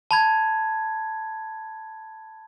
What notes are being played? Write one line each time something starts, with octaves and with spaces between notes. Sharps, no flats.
A5 B5 G#6